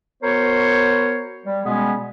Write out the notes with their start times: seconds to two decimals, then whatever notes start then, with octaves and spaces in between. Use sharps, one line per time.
0.23 B3 F#4 A#4 C5 C#5
1.45 G3
1.65 B2 G3 G#3 B3 C#4 G#4